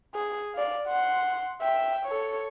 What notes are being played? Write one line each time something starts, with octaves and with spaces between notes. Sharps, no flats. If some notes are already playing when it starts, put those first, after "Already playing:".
G#4
D5 F5
F#5 C6
E5 G5
A4 C#5